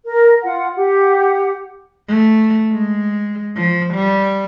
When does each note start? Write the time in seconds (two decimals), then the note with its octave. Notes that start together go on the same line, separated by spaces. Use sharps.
0.05 A#4
0.43 F4 F#5
0.76 G4 F#5
2.08 A3
2.72 G#3
3.56 F3
3.94 G3